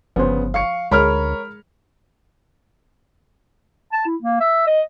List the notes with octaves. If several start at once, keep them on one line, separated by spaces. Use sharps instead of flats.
G1 C#3 F3 B3 C5
F5 C#6 C#7
D2 G#3 A#4 C#5 B5 F6
A5
E4
A#3
E5
D#5